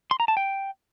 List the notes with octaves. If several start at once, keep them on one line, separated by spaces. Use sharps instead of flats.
C6
A#5
A5
G5